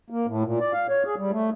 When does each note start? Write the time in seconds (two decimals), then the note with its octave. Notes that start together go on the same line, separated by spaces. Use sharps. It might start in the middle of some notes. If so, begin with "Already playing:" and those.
0.10 A#3
0.27 A2
0.44 A#2
0.60 D5
0.73 F5
0.89 C#5
1.05 G#4
1.17 G3
1.31 A3